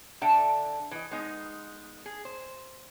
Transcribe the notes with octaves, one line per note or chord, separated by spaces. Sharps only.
D3 D4 A4 E5 G5 A#5
E3 D#5
G#3 B3 D#4
G#4
C5